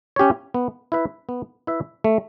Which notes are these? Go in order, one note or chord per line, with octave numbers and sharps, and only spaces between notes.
C#4 G4 C#5
B3
E4 B4 E5
B3
E4 B4 E5
A3